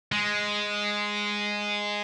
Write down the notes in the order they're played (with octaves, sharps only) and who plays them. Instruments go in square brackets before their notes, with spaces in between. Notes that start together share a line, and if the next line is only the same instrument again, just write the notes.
[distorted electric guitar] G#3